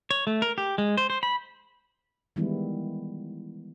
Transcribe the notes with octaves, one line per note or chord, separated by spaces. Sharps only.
C#5
A3
A#4
G4
G#3
C5
C5
B5
D#3 E3 G3 G#3 B3 E4